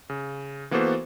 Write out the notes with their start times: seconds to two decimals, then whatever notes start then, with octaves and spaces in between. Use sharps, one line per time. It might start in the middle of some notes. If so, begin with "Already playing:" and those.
0.10 C#3
0.71 E3 A#3 B3 F#4 A4 C5